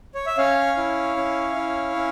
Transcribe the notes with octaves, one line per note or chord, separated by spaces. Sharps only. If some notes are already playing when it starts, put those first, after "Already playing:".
C#5
E5
C#4 C#5 F5
E4
C#4
E4
C#4